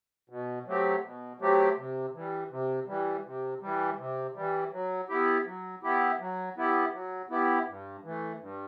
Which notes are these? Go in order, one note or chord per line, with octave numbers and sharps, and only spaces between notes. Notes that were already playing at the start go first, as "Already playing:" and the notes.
B2
F#3 A3 C4 G4
B2
F#3 A3 C4 G4
C3
E3 G3
C3
E3 G3
C3
E3 G3
C3
E3 G3
F#3
B3 E4 G4
F#3
B3 E4 G4
F#3
B3 E4 G4
F#3
B3 E4 G4
G2
E3 A3
G2